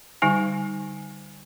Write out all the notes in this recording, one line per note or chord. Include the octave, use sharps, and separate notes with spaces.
D3 G3 D#4 G#5